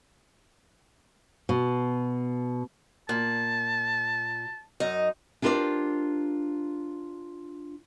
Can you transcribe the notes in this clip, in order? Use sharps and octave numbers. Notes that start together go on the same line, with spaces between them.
B2
A#2 A5
F#2 D#4 D#5
D4 F4 G4 A#4 C5 D5